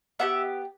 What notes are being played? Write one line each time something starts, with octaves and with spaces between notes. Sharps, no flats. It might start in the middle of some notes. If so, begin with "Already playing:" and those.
B3 D4 G4 E5 F#5